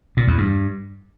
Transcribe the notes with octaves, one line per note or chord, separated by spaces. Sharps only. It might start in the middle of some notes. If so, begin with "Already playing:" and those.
A#2
E2
G2